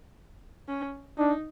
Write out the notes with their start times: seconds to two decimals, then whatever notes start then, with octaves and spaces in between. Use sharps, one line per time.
0.68 C#4
1.18 D4 D#4